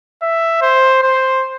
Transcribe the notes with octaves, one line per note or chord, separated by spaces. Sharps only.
E5
C5
C5